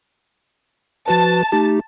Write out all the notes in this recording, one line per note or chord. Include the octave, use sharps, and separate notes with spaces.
F3 F#4 B4 A5
A3 D#4 G4